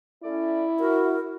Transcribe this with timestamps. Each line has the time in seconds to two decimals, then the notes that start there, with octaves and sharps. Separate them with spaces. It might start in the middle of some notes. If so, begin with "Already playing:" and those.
0.23 A3 C#4 E4 D5
0.80 F#4 A#4